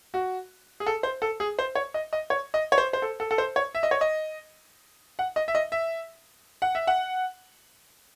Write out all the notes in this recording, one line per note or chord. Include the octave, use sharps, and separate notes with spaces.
F#4
G#4
A4
C5
A4
G#4
C5
C#5
D#5
D#5
C#5
D#5
C#5
C5
C5
A4
A4
A4
C5
C#5
E5
D#5
C#5
D#5
F#5
D#5
E5
D#5
E5
F#5
E5
F#5